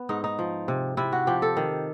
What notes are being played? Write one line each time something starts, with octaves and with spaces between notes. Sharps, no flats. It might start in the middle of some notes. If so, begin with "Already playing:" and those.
Already playing: B3
G#2 D#4
D#4
F3
C3
C3 E4
F#4
F3 G4
A4
D#3